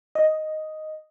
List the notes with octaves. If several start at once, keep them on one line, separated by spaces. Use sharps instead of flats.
D#5